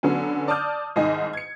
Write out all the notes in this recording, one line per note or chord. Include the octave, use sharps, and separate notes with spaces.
D3 F#3 B3 C#4
D5 A5 D6 D#6 F6 G6
C2 G#2 D#3 D#5 G#5
G#6 C#7